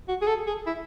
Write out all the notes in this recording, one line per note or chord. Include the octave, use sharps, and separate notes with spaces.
F#4
G#4
A4
G#4
E4